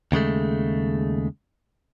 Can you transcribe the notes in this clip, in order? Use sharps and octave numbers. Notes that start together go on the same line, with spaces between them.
D#2 C#3 G#3 A3